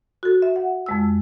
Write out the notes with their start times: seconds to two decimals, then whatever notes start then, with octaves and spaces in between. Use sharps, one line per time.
0.23 F#4 A4
0.42 E5
0.56 F#5
0.86 F2 G#3 E6